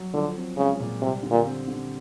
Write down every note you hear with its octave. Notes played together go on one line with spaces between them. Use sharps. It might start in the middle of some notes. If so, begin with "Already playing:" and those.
Already playing: F#3
D3 F3
C4
C#3 G#3
A#2
C3 G3
D3
A#2
C4
D3